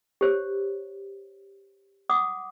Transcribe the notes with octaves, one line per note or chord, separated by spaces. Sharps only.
G4 C5 C#5
F#5 D6 D#6